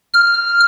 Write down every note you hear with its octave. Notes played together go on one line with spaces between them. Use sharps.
F6